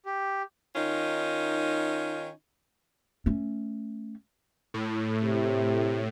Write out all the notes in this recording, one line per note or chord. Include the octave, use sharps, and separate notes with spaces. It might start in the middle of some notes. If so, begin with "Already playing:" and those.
G4
D#3 C#4 D#4 F4
A3 C#4
A2
C3